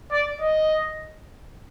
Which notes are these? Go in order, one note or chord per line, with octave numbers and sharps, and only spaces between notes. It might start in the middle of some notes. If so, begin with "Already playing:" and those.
D5
D#5